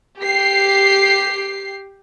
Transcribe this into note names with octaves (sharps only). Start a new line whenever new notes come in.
G4 C7